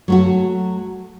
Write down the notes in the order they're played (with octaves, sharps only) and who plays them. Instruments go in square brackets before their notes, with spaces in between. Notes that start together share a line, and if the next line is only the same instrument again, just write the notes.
[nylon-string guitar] F#3 A3 F#4